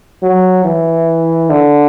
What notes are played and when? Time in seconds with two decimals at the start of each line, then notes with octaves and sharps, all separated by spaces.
0.23 F#3
0.65 E3
1.50 D3